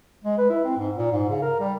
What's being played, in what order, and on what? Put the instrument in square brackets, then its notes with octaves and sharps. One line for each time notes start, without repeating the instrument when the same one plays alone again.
[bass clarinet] G#3
B4
E4
C4
G#2
A#2
G#2
C#3
A#4
G3